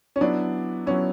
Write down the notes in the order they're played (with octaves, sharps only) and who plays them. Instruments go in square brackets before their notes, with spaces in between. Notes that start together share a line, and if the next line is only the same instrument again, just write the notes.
[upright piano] C#4
[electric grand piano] F#3 B3 E4 [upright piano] D4
[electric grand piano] F#3 B3 E4 [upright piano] C#4